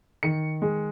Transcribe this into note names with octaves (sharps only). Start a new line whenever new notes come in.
D#3 C#7
G#3